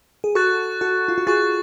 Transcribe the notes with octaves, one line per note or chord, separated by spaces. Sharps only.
G#4
F#4 A4 C#6 F#6 A6
F#4 A4
F4
F#4
F4 G#4 C#6 F#6 A6